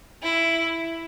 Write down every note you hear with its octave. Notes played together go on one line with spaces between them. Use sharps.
E4